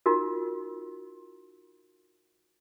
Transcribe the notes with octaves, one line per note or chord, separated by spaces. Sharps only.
D#4 F4 F#4 A#4